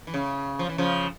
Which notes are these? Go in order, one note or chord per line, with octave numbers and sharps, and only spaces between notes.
E3
C#3
F3
E3
C#3 F3